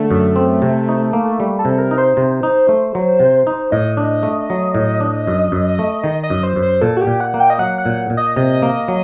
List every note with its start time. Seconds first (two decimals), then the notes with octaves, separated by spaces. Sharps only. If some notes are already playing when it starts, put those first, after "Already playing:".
Already playing: D3 A3
0.11 F#2
0.36 C4
0.62 C3
0.89 D#4
1.13 A#3
1.40 G3
1.59 A4
1.65 C3
1.78 A#4
1.91 D#4
1.98 C5
2.17 C3 C5
2.43 D#4
2.69 A3
2.95 F#3
3.20 C3
3.47 D#4
3.72 A2 D#5
3.97 D4
4.23 A3
4.50 F#3
4.75 A2
5.00 D4
5.27 F#2
5.52 F#2
5.79 A3
6.04 D#3
6.23 D#5
6.30 F#2
6.43 C5
6.56 F#2
6.63 C5
6.81 A#2 A4
6.97 F#4
7.01 G4
7.07 A#2
7.20 F#5
7.34 A#3
7.40 G5
7.50 D#5
7.59 F#3 F#5
7.78 F#5
7.86 A#2
8.10 A#2
8.17 D#5
8.36 C3 D#5
8.62 A#3
8.88 F#3